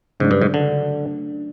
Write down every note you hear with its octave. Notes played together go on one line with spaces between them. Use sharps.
G#2 C#3 F#3 A3 D4
G2
G#2
D3